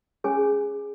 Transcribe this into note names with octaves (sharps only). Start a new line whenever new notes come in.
C#4 G#4 C#5 G#5